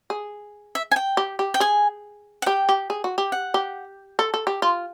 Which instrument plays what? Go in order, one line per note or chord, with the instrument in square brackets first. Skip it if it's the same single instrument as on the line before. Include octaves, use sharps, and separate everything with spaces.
[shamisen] G#4
[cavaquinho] E5
G#5
G5
[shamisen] G4
G4
[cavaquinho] G5
[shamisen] G#4 [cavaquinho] G#5
[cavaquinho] F#5
[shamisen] G4 [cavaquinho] G5
[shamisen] G4
G#4
F#4
G4
[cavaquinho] F#5
[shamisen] G4
A4
A4
G4
F4